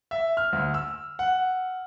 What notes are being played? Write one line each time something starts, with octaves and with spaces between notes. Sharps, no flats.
E5
F6
D2
E6
F#5